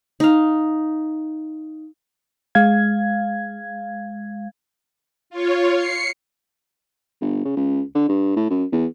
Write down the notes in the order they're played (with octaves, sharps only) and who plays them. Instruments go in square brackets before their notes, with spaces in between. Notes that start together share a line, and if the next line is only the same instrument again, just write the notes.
[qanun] D#4 F5
[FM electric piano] G#3 F5 G#6
[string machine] F4 C#5
C7 C#7
[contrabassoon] G1
C#3
C#2
D3
G2
A2
F#2
E2